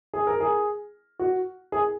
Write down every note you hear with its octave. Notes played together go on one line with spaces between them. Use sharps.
G#4
A#4
G#4
F#4
G#4